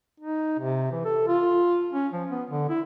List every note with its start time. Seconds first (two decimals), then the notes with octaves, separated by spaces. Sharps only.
0.20 D#4
0.59 C3
0.91 E3
1.05 A4
1.28 F4
1.93 C#4
2.13 F3
2.30 B3
2.50 D3
2.69 E4